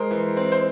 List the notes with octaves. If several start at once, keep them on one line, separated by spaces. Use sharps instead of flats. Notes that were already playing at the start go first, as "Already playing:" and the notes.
Already playing: G#3 A#4 C5
E3
C4
C5